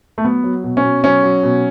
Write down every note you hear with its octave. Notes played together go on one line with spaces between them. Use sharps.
A3
F#3 B3
F#3
B2
C#4
B2
F#3 C#4
F#3
B2